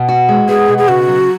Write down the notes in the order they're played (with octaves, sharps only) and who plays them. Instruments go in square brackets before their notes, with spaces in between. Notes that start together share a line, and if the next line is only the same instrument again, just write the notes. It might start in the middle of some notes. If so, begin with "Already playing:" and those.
Already playing: [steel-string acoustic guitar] B2
F#4
G#3
[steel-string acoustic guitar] B3 [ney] G#4
[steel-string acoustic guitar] B2
[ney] G#4
[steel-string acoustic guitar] C#3 [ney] F#4
[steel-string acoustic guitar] F#3